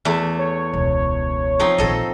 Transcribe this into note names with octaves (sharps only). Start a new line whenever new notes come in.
E2 A3 E5
C#5
E1 C#2
F3 C4 D#4
A#1 D#3 A4 D#5